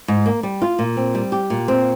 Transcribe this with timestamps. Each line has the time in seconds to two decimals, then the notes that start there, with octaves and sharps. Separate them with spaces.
0.08 G#2
0.26 A#3
0.43 G3
0.62 F4
0.79 A#2
0.97 C4
1.15 G3
1.32 G4
1.50 A#2
1.68 C4